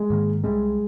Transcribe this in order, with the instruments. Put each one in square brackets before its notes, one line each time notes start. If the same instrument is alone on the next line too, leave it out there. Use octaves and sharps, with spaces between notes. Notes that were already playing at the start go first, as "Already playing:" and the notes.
Already playing: [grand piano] G#3
[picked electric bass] G#2 D#3 A#3
[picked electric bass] C2 C3 G3 [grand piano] G#3